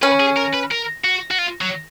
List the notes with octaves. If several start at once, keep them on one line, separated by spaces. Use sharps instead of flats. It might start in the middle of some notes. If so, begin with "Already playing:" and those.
C#4 B4
G#4
A#4
B4
A#4
F#4
F#4
F4
F#3